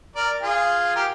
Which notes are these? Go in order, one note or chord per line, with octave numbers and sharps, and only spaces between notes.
A#4 D5
F4 G#4
G4 A#4